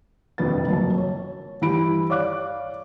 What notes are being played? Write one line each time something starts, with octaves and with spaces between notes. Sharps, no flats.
D#1 C2 F2 D4 B4 A6
F#1 F#2 A5
C#5
G2 E3 E4 G4 B5 D7
C#5 D5 F5 D6 F#6